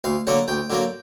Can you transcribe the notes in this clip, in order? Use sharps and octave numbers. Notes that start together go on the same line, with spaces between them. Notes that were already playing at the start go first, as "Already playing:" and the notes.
D2 F5
D3 F#3 A#3 F#5
D2 G5
D3 F#3 A#3